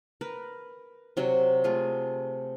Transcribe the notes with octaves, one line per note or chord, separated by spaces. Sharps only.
A#4 B4
C3 F#3 F#4
A3 F4 G#4